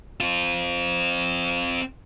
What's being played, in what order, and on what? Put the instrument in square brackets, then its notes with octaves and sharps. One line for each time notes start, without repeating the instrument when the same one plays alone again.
[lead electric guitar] C4 F4